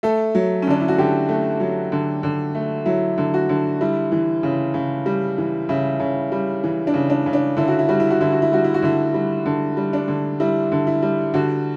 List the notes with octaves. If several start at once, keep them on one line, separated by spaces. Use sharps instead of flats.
A3 A4
F#3
C#4
D3 D4
E4
F#4
D3 G4
A3
F#3
D3
D3
A3
F#3 E4
D3
F#4
D3
G3 E4
E3
C#3
C#3
G3
E3
C#3 E4
C#3
G3
E3
D4
C#3
D4
C#3
D4
D3 E4
F#4
E4
G3 F#4
E4
F#4
D3 E4
F#4
E4
G3 F#4
E4
F#4
D3 E4
G3
D3
G3
D4
D3
G3 E4
D3
E4
G3
D3 F#4